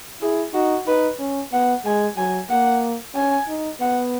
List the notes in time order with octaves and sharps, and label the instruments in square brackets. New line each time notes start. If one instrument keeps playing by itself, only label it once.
[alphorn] E4 [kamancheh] G#4
[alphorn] D#4 [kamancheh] F#4
[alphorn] D#4 [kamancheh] B4
[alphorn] C#4
[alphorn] B3 [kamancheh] F#5
[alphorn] G#3 [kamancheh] G#5
[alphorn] F#3 [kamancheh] G#5
[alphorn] A#3 [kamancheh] F#5
[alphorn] C#4 [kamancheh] G#5
[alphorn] D#4
[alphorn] B3 [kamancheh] F#5